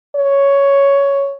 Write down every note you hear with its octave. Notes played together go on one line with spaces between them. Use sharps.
C#5